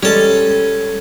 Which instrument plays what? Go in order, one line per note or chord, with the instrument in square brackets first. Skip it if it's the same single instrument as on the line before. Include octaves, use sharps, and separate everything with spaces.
[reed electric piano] G3 G#3 [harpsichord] C#4 A4